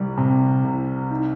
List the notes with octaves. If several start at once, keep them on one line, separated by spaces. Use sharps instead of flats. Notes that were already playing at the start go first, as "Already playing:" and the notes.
Already playing: C2 G3
C3
C2
D#4